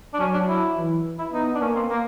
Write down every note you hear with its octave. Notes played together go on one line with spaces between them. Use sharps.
D4
F#3 C#4
D4
E4
E3
E4
B3 D#4
D4
A#3 C#4
C4
A#3